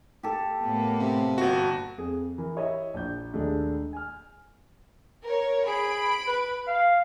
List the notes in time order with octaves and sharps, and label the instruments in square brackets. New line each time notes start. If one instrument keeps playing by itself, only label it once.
[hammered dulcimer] G4 A4
[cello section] A2 A#3 B3
[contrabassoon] C3
[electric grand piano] G1 F#4 [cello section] A#2
[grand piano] F2 G#4
E3 A#4
E4 G4 C#5 D#5 E5
A#1 G6
D#2 G#3 A3 D4
G#5 F6
[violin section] A#4 C#5
[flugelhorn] G#4 [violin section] B5 D7
[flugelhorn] B4
F5